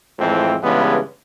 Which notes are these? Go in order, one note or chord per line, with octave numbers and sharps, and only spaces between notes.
F2 A2 E3 G#3 C4
G2 C#3 E3 G#3 B3